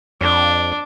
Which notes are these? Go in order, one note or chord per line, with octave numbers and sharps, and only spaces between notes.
F2 D4